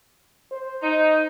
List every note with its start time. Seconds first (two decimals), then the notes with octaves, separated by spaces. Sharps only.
0.52 C5
0.81 D#4